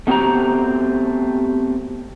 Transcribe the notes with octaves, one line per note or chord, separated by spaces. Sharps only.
A3 B3 C4 F#4 G4 A#5